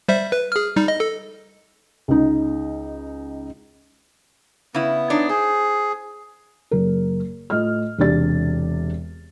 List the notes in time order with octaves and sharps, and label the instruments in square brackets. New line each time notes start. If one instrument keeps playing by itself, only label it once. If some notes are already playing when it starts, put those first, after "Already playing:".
[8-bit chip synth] G3 C5 E5
B4
G#4 F6
G3 D#4
D#5
A4
[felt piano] C#2 D#4
[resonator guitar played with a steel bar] C#3 E4 [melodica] B3
[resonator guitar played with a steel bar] D4 D#4 C#5
[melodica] G#4 [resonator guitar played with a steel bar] C5
[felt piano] F#1 A#4
A2 F4 D#5 F6
E1 C3 D4 G4 D5 A6